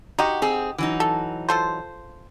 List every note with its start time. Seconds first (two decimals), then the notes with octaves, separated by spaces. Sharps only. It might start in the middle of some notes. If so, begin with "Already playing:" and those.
0.19 D#4 F#4 G4
0.42 C4 G#4
0.78 E3 F#3 D#4
1.00 A4
1.49 F4 A4 C5